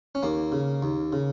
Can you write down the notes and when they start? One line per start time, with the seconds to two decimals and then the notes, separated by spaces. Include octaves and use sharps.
0.15 C#4
0.23 D#2 A#3
0.52 C#3
0.82 D#2
1.13 C#3